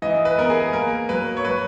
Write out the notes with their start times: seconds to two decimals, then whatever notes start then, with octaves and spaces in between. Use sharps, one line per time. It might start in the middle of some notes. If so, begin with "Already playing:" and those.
0.02 E3 D#5
0.25 B4
0.38 B3 A#4
0.50 G#4
0.73 A#3 A#4
1.09 F#3 B4
1.37 C#5
1.44 F#3 B4